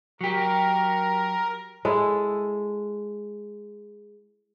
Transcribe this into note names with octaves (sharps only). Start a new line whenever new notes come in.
F#3 G4 A#4
G#3 E4 A4